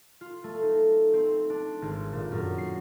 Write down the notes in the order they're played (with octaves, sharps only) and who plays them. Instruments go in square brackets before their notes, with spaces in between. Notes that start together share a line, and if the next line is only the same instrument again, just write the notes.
[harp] F4
A3
D#4
C4
D4
G#1
A#2
F#2
C7